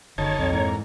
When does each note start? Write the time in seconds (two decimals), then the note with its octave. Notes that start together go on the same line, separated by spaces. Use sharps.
0.18 F#1 D3 D#3 C#5 A5
0.38 B1 F2
0.53 G#2 E3 A#3